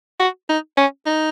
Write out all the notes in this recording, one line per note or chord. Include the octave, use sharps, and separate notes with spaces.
F#4
D#4
C#4
D#4